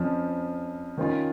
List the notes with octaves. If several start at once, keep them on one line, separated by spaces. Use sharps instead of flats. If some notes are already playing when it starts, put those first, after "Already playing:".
Already playing: F2 F3 C#4
D#3 C#4 F4